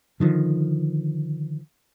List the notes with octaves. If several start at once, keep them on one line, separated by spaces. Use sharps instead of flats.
D3 D#3 F3